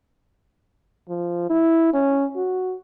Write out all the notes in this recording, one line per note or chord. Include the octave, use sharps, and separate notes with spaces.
F3
E4
C#4
F#4